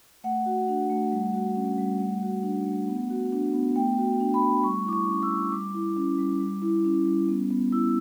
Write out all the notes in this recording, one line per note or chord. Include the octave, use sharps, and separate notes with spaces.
A3 F#5
F#4
D4
A3
G3
F#4
C#4
G3
A3
F#4
D4
A3
B3
F#4
D4
B3
A3 G5
F#4
D4
B5
A3
G3 C#6
E4 D6
C#6
C#4
E6
G3
G3 D6
E4
C#4
G3
G3
E4
C#4
G3
B3
B3
E4 E6